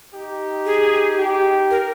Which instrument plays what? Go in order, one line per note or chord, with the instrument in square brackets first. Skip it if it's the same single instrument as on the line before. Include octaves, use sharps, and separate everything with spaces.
[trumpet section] D#4 G4
[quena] G#4
[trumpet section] D#4 G4
[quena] A#4